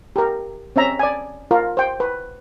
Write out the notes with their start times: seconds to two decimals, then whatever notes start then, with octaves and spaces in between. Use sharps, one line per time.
0.16 G4 A#4
0.76 C4 C#4 E5 A#5
0.99 D5 G#5
1.51 F4 A#4
1.77 C5 G5
2.00 B4